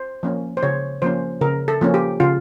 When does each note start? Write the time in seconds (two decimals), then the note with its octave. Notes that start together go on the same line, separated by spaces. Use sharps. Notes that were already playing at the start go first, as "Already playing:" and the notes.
Already playing: C5
0.23 F3 A#3 C#4
0.57 C5
0.63 C#3 C#5
1.02 F3 A#3 C#4 C5
1.41 C#3 A#4
1.68 A4
1.81 F3 A#3 C#4
1.94 G4
2.20 C#3 F4